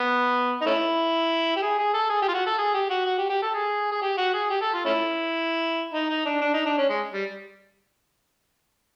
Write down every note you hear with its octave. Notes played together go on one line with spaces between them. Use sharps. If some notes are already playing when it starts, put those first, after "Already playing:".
Already playing: B3
D#4
A3 C#4 E4
G4
G#4
G#4
A4
G#4
G4
F4
F#4
A4
G#4
G4
F#4
F#4
G4
G4
A4
G#4
G#4
G4
F#4
G#4
G4
A4
F4
A3 C#4 E4
D#4
D#4
D4
D4
D#4
D4
C#4
G#3
G3